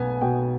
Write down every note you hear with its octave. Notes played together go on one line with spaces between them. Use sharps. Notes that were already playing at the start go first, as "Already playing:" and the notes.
Already playing: B1 B3 G#5
B2 G5